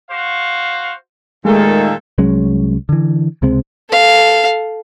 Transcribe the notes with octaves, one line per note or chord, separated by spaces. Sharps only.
F#4 C5 F5
D#2 A#2 D#3 G#3 A3 A4
C2 F#3 G#3 C#4
D3 E3
C#2 C3 G#3 C4
A4 F5